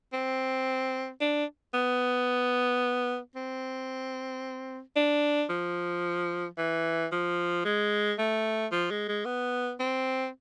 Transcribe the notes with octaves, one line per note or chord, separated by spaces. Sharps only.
C4
D4
B3
C4
D4
F3
E3
F3
G#3
A3
F3
G#3
G#3
B3
C4